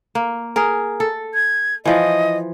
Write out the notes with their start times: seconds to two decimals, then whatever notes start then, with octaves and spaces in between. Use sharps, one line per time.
0.15 A#3
0.56 G#4 A#4
1.00 A4
1.34 G#6
1.85 E3 F3 D#5